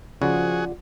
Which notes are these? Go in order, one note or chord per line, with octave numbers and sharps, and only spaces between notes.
C#3 F3 F4 F#4 G#4 D5 F#5